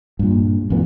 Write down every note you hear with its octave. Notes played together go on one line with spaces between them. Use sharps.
G2 A#2
A1 F2 A#2 B3